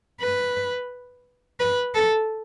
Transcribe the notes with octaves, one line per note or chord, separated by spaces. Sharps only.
B4
B4
A4